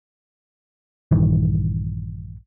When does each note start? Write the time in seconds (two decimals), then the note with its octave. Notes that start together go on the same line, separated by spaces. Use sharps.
1.11 A#1 G2 D#3 E3